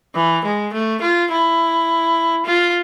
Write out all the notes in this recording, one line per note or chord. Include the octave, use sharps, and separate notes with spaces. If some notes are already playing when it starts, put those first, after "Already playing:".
E3
G#3
A3
F4
E4
F4